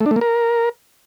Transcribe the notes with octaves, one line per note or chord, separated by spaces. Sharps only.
A3
D4
A3
A#3
A#4